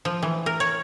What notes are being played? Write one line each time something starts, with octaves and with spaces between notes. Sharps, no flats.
F3
E3
A#4
C#5